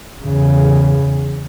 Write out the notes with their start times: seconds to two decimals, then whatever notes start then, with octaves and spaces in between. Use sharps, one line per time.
0.24 E2 C#3